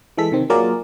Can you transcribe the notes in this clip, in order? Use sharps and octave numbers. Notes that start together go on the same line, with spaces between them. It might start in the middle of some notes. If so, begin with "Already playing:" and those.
E3 G#3 A4 B6
C3 D#3 C4
F#3 A#3 F4 G#4 A#4 D5